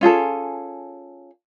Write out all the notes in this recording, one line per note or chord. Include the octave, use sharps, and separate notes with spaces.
C#4 F4 G#4 A4